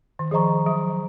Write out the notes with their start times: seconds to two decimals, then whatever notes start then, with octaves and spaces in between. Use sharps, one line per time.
0.19 D#3
0.31 F3 G#4 C5 D#5 A#5 C#6
0.66 F#3